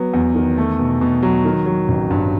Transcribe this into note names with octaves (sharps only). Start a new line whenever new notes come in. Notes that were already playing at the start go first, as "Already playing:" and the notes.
Already playing: F#3 B3
E2
D#3
A3
B2
B2
F#3
D#3
F#3
A1
G2